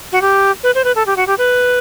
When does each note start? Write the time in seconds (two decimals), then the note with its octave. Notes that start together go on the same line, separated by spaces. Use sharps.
0.12 F#4
0.22 G4
0.63 B4
0.75 C5
0.84 B4
0.96 A4
1.07 G4
1.17 F#4
1.27 G4
1.38 B4